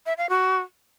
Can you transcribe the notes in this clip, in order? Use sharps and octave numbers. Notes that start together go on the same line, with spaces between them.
E5
F5
F#4